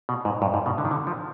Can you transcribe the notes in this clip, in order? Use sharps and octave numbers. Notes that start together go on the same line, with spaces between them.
B2
G#2
G2
G#2
B2
D3
D#3
D3
F3